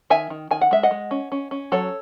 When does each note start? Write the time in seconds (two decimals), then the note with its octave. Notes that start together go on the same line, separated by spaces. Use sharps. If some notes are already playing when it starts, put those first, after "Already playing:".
0.10 D#3 E5 G#5
0.30 D#3
0.51 D#3 G#5
0.61 F#5
0.71 G#3 E5
0.83 D#5 F#5
0.91 G#3
1.11 C#4
1.32 C#4
1.51 C#4
1.72 F#3 A4 C#5